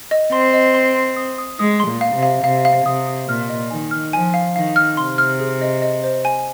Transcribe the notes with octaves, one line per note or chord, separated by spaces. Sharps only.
D#5
C4 C6
D#5
C6
C6
D#6
D#6
G#3 D#6
C6
A#2
F5
C3
F5
C3 F5
F5
C3 D#6
D#6
A#2 F6
D#5
D#3 G#5
F6
F3 G#5
F5
D#3 F5
F6
C3 C6
F6
G#4
D#5
D#5
C5
G#5